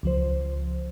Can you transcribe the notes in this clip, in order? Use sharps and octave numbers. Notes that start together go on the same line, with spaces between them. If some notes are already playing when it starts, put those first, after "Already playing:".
C#2 F3 C5